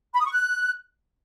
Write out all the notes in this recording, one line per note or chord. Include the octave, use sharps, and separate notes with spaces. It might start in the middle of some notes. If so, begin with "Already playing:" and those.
B5
D#6
C#6
F#6